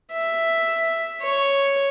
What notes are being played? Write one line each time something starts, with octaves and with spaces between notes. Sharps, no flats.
E5
C#5